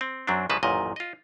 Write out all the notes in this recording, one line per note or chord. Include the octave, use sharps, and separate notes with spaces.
C4
F#2 F#3 C4 D4
C2 C#3 F3 A#3 B4 A5
A1 F#2 A#2 D#3 D#5
F4 D#5